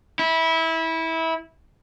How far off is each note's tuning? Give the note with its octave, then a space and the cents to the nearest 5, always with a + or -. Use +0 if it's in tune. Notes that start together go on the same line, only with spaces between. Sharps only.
E4 -20